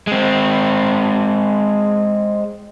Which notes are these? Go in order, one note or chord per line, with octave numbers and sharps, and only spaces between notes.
G#3 C4